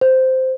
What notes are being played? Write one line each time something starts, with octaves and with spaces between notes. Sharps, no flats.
C5